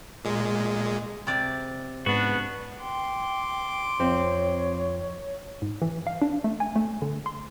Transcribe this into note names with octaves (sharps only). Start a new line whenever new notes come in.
A#2 G#3
C3 D5
G#2 B3 D4 F#4
G5 C6 D6
F2 C4 C#5
G#2
E3
F5
D4
A3
G#5
A3
D3
C6